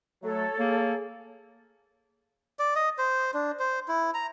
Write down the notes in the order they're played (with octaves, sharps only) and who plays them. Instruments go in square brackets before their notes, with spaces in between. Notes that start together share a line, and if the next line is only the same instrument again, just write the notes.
[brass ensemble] F#3 A3 [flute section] A4 C#5
[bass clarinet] A#3 [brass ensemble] G#4
[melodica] D5
D#5
C5
D4
C5
E4
A#5